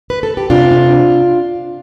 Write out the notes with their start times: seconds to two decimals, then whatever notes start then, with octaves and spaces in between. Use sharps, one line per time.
0.10 B4
0.23 A4
0.37 G4
0.50 C3 D4 F4
0.71 D4